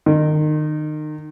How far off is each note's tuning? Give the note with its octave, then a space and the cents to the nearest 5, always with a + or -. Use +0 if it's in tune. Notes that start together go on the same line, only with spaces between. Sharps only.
D#3 -30